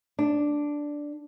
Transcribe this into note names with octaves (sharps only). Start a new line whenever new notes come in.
D4